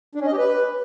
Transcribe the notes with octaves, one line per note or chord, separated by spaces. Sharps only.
D4
C#4
D#5
G4
B4